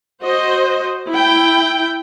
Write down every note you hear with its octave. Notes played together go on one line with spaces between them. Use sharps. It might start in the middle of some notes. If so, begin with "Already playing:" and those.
F#4 C5 D#5
E4 G5